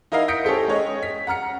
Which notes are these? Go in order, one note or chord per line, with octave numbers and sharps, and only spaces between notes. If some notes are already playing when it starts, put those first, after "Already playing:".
D#4 E4 A#4 D#5 F5 F#5
D#6 G6 A#6 B6 C#7 D7
C#4 G4 A4 C5
G#3 C#5 D#5
B6
F#5 A#5 F6 C#7